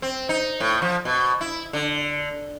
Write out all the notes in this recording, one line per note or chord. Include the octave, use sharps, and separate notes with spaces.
C4
D#4
A2
F3
B2
E4
D3